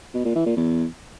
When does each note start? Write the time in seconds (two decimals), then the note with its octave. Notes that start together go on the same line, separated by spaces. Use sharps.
0.14 B2
0.25 A#2
0.35 E3
0.46 A#2
0.57 E2